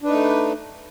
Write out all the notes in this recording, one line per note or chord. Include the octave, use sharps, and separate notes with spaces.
A3 D4 D#4 B4